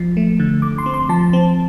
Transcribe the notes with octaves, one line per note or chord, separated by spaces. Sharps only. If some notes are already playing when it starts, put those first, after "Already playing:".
Already playing: F3
A3
D3
D3 D6
C6
C4
C6
F3 A5
C4